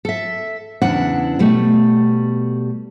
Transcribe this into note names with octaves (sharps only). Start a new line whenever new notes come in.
A4 E5
E2 C#3 D4 E4 F#5
B2 G3 A3